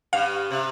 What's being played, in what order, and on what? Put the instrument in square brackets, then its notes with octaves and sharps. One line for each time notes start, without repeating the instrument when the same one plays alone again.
[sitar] G2 [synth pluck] F5
[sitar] C3